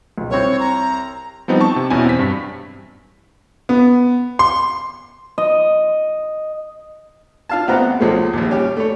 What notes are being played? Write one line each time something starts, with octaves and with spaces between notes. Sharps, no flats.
C#2 B2
C2 C4 C#5
A#5
F3 G3 B3 C4 D#4
A5 C#6
C3
E2 B2 C#4 E4 G#5
C4 B6
G2
B3
C6
D#5
F4 F5 A5
A1 B3 C4 F#5 A#5
C#2 F3 F#3 G#3 A3
A#1 D#2
G3 C#4 G4
A3 C#5